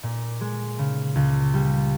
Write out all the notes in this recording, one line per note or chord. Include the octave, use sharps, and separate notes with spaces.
A#2
G#3
C#3
C#2
G3